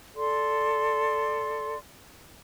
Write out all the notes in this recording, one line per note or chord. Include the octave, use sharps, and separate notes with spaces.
A4 D5 C6